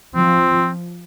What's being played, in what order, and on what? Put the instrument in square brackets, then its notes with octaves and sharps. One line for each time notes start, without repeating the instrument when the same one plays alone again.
[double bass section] F3 [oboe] C4